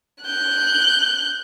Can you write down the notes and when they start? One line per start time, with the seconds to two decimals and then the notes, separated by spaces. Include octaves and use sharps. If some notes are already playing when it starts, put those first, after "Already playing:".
0.23 F#6 G6